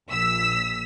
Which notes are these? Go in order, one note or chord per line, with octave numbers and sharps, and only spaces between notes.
A#1 E6 B6